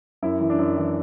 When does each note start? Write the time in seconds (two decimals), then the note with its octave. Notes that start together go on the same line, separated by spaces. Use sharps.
0.23 F#2 E4
0.41 E3
0.50 D4
0.59 F#2
0.77 E3